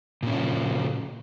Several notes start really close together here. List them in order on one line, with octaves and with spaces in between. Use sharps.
A#2 C#4 C#3 F3